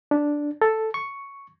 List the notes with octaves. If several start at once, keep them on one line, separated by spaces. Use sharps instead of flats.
D4
A4
C#6